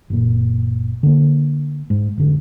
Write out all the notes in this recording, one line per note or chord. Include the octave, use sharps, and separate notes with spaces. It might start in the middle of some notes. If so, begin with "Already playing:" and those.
F#1 A#2
D3 A#3
G#2
F1 D3